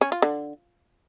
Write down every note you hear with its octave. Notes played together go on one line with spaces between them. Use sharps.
C#4
F4
D3